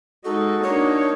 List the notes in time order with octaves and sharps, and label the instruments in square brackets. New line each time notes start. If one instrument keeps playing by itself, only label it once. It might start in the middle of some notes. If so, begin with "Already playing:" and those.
[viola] G#3 D#4 [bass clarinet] F#4 [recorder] A4
[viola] A#3 D#4 [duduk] D4 [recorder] C#5